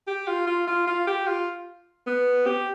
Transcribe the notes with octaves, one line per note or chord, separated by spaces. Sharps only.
G4
F4
F4
F4
F4
G4
F4
B3
G4